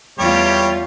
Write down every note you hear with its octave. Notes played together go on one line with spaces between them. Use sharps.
E2 G3 A3 F4 G4 C#5